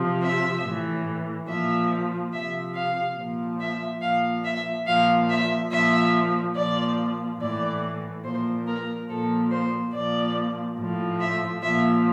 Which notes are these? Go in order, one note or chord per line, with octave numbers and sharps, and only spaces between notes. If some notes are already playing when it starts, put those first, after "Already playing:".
Already playing: C3 F3
E5
A2 E3
A#2 F3 E5
C3 F3 E5
F5
A#2 F3
E5
A#2 F3 F5
E5
A#2 F3 F5
E5
A#2 F3 E5
A#2 F3 D5
A2 E3 D5
A#2 F3 C5
A#4
A#2 F3 A4
C5
A#2 F3 D5
A2 F3
E5
A#2 F3 E5